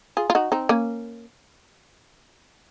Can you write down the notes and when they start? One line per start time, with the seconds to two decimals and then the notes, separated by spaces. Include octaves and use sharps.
0.17 F4 G#4
0.30 F4
0.35 D#4 F#4
0.52 C4 D#4
0.69 A#3 C#4